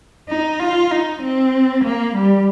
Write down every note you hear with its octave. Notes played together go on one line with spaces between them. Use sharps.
D#4
F4
D#4
C4
A#3
G3